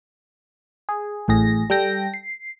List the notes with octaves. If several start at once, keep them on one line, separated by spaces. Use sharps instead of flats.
G#4
A1 A2 G#4 A#6
G3 A4 G5 A#6
C7